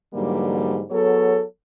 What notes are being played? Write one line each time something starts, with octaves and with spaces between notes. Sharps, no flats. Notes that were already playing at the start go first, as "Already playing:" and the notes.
G#2 D3 E3 F#3 G3 A#3
F#3 B3 G#4 A4 C#5